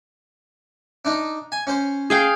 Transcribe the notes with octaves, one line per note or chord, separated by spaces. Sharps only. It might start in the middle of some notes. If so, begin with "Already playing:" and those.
D4 D#4
G#5
C#4 C5
G#4 F5 G5